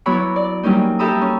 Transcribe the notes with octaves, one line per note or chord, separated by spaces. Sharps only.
F#3 B3 E4 C#5 B5 D6
D5
F#3 G3 A#3 C#4 D#4
G4 A4 E5 A#5 B5 D#6
C#4